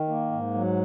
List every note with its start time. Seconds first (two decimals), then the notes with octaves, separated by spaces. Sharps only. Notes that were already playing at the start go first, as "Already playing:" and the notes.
Already playing: D#3
0.08 A#3
0.32 G#2
0.54 F#3